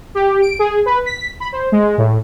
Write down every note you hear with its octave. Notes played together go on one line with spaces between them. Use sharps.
G4
D7
G#4
B4
B6
B5
C5
G#3
A2